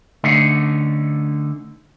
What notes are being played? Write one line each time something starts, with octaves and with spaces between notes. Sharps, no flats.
D3 A3 C#4 D#4